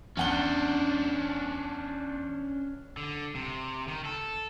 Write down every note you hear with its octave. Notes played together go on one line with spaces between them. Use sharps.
E2 C#4 D4 F#5 G7
D3
C3
D#3
A4